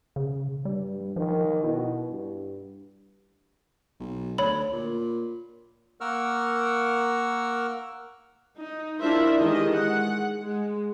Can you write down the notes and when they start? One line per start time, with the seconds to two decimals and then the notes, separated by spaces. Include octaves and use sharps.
0.16 C#3
0.65 G2 G3
1.16 D#3 F3
1.64 B2 E4
2.10 G2
4.00 B1
4.38 D2 C#5 B5 F#7
4.73 A#2
6.01 A#3 A#4 F#5 C#6 E6 F6
8.58 D#4
8.99 D4 E4 F4 A#4 C5 E5
9.39 D#3 E3 G#3 G4 D#5
9.73 G#3 F#5
10.42 G#3